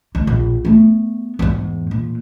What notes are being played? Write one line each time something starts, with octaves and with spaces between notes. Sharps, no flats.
D2
A#1
A3 B3
E2 G#2
A#2